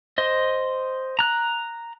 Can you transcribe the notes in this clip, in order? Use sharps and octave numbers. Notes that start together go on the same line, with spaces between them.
C5 D#5
A#5 F#6